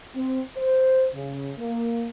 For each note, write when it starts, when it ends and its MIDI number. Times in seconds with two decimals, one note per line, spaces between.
0.14 0.40 60
0.57 1.07 72
1.14 1.51 49
1.58 2.07 58